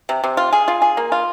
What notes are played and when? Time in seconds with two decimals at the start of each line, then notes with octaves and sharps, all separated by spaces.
0.09 C3
0.24 C3
0.37 F4
0.53 G#4
0.68 F4
0.82 G#4
0.97 A#3
1.12 F4